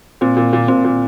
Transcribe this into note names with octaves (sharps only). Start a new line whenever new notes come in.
A#2 C4
A#2
A#2
A#2 C4
A#2